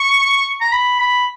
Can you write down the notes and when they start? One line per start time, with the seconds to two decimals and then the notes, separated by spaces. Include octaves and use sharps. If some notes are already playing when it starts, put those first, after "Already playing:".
Already playing: C#6
0.61 A#5
0.72 B5
1.00 B5